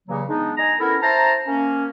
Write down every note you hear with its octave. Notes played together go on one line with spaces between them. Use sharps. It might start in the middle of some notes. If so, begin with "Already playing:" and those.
G2 C#3 E3 F#3 A#3
G#3 B3 D4 D#4
D#5 G#5 A#5
B3 C#4 E4 A4 A#4
E4 C5 A5 A#5
A#3 C#4